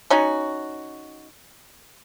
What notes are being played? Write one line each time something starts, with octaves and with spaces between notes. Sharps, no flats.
C#4 D#4 F#4